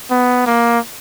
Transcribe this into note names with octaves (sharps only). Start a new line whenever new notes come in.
B3
A#3